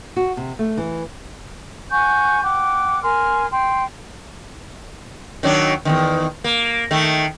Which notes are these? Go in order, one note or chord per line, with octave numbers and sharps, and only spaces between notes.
F#4
C3
A3
E3
F#5 G#5 C#6 G6
F#5 G5 D6
A#4 G#5 C6 F6
G5 C6
D#3 F#3 D4
E2 G#2 D#3
A#3
D#3 A3